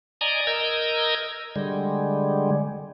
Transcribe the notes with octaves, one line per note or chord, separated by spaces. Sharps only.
D5 D#5 G#5 A#5
A#4 D#5 A#5 E6 G6 G#6
D3 G3 G#3